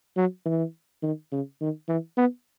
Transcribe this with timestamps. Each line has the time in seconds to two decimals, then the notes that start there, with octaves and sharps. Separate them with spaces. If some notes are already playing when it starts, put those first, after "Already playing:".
0.17 F#3
0.46 E3
1.03 D#3
1.32 C#3
1.61 D#3
1.89 E3
2.17 B3